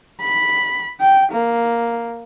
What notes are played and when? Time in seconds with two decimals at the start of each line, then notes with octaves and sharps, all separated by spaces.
0.21 B5
1.00 G5
1.32 A#3